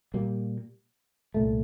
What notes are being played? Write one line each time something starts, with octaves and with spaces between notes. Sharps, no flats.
A#2 G3 A#3
C2 A#2 A3